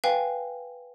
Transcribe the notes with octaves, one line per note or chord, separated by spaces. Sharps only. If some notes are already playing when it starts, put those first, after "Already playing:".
B4 F5 G5 G#5